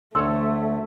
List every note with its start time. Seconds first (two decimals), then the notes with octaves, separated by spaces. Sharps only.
0.15 D2 A3 A4 C#5 C6 E6